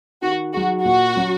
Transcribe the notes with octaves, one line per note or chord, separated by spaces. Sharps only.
D#3 F#4
F#3 D#4 F#4 G#4
A#2 F#4
F#3 C#4